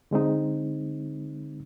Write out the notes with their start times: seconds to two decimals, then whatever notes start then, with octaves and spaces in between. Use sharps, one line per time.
0.11 D3 G#3 C4 D#4